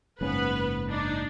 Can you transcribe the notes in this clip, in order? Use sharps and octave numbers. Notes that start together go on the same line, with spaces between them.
F#1 G#2 B3 C#4 B4
D4 D#4